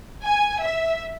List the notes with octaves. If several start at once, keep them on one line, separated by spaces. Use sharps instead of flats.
G#5
E5